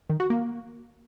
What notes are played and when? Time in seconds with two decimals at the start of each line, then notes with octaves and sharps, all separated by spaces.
0.10 D#3
0.20 F#4
0.30 A#3